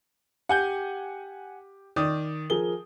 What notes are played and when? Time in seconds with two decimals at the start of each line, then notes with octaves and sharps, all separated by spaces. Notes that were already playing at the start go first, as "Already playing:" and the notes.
0.49 G4 F#5 G#5 G6
1.96 D#3 D5 D6 D#6
2.50 F3 G#4 A#4 G7